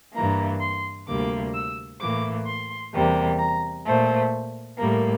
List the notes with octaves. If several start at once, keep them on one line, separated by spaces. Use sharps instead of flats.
G2 E3 A#3 A#5
C6
D2 C3 G3 A#3 D6
E6
A2 E3 A#3 D6
C6
E2 C3 G3 A#3
A#5
A#2 A3 C5
A2 G3 A#3 A#4